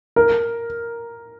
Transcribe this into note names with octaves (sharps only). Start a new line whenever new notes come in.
A#4